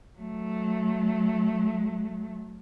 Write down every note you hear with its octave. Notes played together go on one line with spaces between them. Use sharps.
F#3 A3